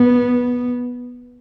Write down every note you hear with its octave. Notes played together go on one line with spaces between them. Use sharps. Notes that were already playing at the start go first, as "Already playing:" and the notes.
Already playing: B3